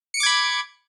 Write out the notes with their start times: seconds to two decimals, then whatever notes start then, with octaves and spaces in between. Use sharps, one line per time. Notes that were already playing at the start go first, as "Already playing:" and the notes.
0.14 C#7
0.17 D7
0.20 D6
0.23 G#6
0.26 B5